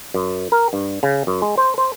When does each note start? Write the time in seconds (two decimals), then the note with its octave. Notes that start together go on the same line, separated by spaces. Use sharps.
0.14 F#2
0.52 A#4
0.73 G2
1.03 C#3
1.27 F#2
1.42 G#3
1.58 C5
1.78 C5